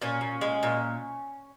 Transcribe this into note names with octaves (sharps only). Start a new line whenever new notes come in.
A#2 C#4
A#2
G#3
A#2